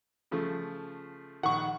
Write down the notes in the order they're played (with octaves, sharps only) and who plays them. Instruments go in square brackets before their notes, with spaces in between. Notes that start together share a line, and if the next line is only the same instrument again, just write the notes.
[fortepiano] C#3 F3 A3
[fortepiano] A#1 D#3 [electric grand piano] F#5 C#6